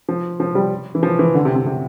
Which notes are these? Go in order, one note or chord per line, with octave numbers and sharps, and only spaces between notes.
F3
F3
G3
E3
F3
E3
D3
C3
C3
C3